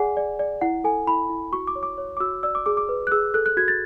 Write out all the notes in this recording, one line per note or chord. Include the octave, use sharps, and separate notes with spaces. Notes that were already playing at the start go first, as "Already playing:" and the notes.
Already playing: G#4 D5 F#5 G#5
D5
D5
E4 F#5
A4 G#5
E4 B5
E4
F#4 C#6
D6
C#5
D6
C#5
D6
F#4 E6
D5 E6
D6
G#4 D6
D6
B4
F#6
G#4 E6
A4 F#6
F#6
F#4 G#6
A6